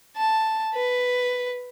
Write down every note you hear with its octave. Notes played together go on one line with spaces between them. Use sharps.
A5
B4